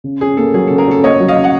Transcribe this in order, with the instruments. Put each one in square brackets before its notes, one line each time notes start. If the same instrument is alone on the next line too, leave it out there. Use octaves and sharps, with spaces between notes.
[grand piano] C#3
[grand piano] C#4 [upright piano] G#4
[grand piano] A#3 [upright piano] A4
[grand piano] F#3 [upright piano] G#4
[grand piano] C#3 [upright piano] A4
[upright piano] G#4 A#4
[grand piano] C#4 [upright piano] A4
[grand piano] A#3 [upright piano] C#5 D#5
[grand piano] F#3
[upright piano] D#5 F5
[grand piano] C#3
[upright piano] F#5